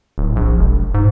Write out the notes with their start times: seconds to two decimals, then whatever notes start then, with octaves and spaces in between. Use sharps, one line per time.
0.18 D1
0.36 A#1
0.59 E1
0.94 G#2